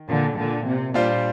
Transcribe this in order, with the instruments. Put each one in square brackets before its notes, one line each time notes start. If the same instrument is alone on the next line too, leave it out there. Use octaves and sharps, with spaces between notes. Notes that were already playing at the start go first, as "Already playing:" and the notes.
Already playing: [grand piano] D#3
[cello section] A#2 D3
A#2 D3
C3
[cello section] A#2 [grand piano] G3 D4 F4 C5